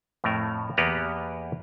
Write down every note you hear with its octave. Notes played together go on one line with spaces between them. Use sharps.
F2 A2 A3 A#4
E2 A#3 B3 G4 B4 A#5